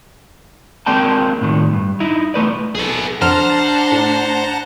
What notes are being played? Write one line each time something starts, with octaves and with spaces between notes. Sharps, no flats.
G#3 A#3 C4 D5 G5 A5
A2 D#3
G2
D#4 E4
E2 A3 B4 D5
B1 G#4 A4 B4
F2 D4 C5 F#5 A5 A#5 F6
A2